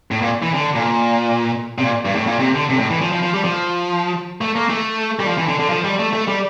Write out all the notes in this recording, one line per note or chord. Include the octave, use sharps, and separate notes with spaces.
A2
A#2
E3
D3
A#2
C3
A#2
G2
A2
A#2
C3
D3
C3
A2
E3
F3
F3
F3
G3
F3
A3
A#3
A3
G3
F3
E3
D3
D3
F3
G3
A3
A3
G3